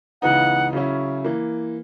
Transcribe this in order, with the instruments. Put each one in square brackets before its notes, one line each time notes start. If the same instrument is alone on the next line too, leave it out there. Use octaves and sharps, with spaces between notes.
[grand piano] C#2 C#3 E3 B3 D#4 [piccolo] F#5
[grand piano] C#3 F#3 C#4 E4
E3 A#3